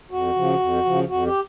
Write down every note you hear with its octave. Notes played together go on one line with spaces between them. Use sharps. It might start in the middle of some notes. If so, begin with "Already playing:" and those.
F2 F#4
C#3 F3
F2
C#3 F3
F2 F#4
G4